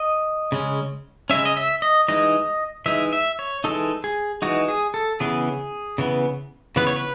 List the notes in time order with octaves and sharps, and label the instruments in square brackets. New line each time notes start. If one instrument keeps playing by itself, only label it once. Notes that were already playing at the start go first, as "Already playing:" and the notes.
Already playing: [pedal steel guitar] D#5
C#3 G#3 C#4
C#3 G#3 C#4 E5
D#5
E5
D#5
E3 G#3 D#4 D#5
E3 G#3 D#4 E5
E5
C#5
E3 G#3 D#4 A4
G#4
E3 G#3 D#4 F#4
G#4
A4
C#3 E3 B3 G#4
C#3 E3 B3
C#3 E3 B3 B4
C#5
B4